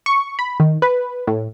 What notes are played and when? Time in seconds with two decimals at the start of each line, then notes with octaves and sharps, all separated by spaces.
0.06 C#6
0.39 B5
0.60 D#3
0.82 B4
1.27 A2